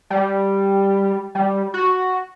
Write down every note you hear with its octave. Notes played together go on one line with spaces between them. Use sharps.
G3
G3
F#4